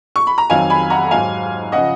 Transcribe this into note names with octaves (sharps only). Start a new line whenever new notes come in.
C#6
B5
A#5
F2 D#3 F#3 F5 G#5
G#5 B5
F#5 A#5
G#2 F#3 F5 G#5
C#3 F3 D#5 F#5